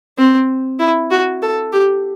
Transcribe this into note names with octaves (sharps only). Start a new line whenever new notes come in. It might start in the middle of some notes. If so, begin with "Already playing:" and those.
C4
E4
F#4
A4
G4